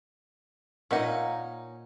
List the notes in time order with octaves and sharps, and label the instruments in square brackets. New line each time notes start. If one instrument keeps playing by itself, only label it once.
[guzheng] A#2 A#3 [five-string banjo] C#4 D#4 [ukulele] A#4 E5 F#5